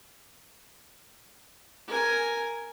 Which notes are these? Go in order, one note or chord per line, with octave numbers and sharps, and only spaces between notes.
A#4 G#5